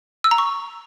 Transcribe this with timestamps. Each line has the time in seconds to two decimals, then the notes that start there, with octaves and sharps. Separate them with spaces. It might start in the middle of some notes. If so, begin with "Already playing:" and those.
0.24 E6
0.31 A#5
0.38 C#6